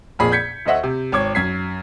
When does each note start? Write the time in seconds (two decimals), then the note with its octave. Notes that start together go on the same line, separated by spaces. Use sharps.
0.19 A#1 F2 A#2 G#4 B5
0.32 G6 G#6 B6 C#7
0.66 D2 A3 C5 D#5 E5 F#5
0.83 C3
1.12 G#1 C#5 D6 G#6
1.35 F#2 G#6 B6 C7